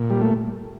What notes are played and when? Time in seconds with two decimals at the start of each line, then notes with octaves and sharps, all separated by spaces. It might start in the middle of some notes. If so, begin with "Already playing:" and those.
Already playing: A#2
0.10 G3
0.21 A3